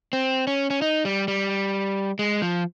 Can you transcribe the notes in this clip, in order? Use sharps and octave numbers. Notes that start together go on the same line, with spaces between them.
C4
C#4
C#4
D#4
G3
G3
G#3
F3